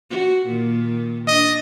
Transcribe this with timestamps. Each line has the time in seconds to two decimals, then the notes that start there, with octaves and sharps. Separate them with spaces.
0.10 F#4
0.46 A#2 D#3
1.28 D4 D#5